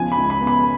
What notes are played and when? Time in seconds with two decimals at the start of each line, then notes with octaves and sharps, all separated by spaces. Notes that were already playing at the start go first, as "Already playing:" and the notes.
Already playing: C#2 C#3 F3 B3 G#5
0.12 B5
0.18 C#2
0.30 B5
0.41 B3
0.47 B5